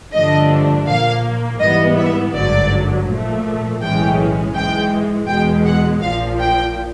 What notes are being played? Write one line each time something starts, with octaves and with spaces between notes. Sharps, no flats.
G2 D3 F3 A3 D4 D#5
A#2 F3 A#3 F5
G#2 E3 G3 B3 D#5
E5
G#1 G2 D3 F#3 D5
A#2 F3 A3
B1 A2 E3 G#3 C#4 G5
G#2 E3 G#3 G5
E2 B2 G#3 G5
F#5
A#1 A#2 F3 F5
G5